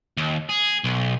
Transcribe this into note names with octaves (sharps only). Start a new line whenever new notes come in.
D#2
G#4
B1